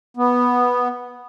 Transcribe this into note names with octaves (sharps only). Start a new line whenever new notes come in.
B3